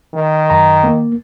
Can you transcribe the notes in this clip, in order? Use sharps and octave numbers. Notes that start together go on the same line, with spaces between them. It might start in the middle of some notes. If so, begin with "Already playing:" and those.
D#3
F#2 A#5
A#3